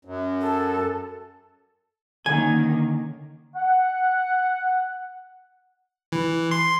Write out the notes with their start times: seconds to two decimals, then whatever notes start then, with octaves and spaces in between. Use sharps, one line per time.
0.05 F#2
0.41 A4
2.26 D3 D#3 A#3 C#4 G#5 G#6
3.56 F#5
6.12 E3
6.51 C6